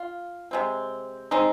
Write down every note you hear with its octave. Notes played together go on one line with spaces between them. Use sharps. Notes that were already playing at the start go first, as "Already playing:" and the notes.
Already playing: F4
C3 G#3 C4
G#3 C4 D#4